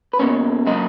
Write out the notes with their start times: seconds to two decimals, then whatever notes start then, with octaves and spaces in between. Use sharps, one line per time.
0.13 B4
0.19 B2 A#3 C#4 C#5
0.67 C#3 F#3 A#3 D#5